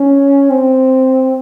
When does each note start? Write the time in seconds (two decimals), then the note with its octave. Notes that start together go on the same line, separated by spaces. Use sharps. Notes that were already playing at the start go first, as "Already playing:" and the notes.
Already playing: C#4
0.50 C4